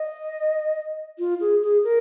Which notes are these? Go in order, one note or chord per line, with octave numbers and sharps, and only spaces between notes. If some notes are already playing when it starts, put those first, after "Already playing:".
Already playing: D#5
F4
G#4
G#4
A#4